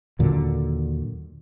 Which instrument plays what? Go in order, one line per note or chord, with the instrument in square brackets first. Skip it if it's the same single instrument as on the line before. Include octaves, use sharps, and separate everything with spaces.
[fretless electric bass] D#2 A#2 D3 F#3